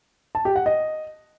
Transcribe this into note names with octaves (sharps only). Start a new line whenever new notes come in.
A5
G4
F#5
D#5